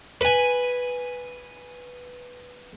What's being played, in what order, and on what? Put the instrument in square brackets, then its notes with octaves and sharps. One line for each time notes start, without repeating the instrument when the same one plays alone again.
[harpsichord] B4 G#5